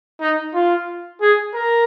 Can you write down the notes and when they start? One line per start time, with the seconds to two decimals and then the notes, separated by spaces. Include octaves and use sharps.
0.21 D#4
0.54 F4
1.21 G#4
1.54 A#4